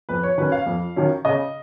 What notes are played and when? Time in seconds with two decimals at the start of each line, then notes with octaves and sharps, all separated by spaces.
0.09 F2 B4
0.23 C#5
0.38 D#3 F#3 C#4 B4
0.52 F5
0.66 F2
0.96 D#3 F#3 C#4
1.25 C#3 D#5